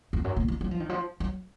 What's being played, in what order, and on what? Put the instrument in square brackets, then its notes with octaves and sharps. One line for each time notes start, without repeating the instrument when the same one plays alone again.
[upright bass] F2
F#2
A#2
F3
F#3
F3
D#3
F3
F#3